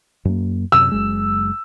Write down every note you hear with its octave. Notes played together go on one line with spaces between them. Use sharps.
F#2 A#3
F#2 C3 E6
F#1 G#3